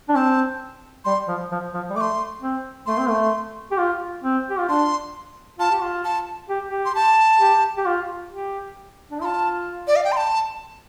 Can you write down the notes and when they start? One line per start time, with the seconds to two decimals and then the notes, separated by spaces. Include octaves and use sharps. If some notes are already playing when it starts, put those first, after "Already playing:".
0.09 D4
0.15 C4 A5
1.05 G3 C6
1.28 F3
1.51 F3
1.74 F3
1.90 G3
1.96 A3 D6
2.01 C6
2.42 C4
2.86 A3 C6
2.98 C4
3.09 A3
3.71 G4
3.78 F4
4.23 C4
4.49 G4
4.59 F4
4.69 D4 C6
5.58 F4 A5
5.71 G4
5.82 F4
6.04 A5
6.49 G4
6.69 G4
6.85 C6
6.95 A5
7.40 G4
7.77 G4
7.86 F4
8.31 G4
9.10 D4
9.21 F4 A5 C6
9.88 D5
9.96 F5
10.04 G5
10.12 C6
10.17 A5